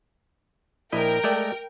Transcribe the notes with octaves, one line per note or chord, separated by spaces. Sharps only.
A#1 E4 A#4 D#5 G5
G#3 A3 D5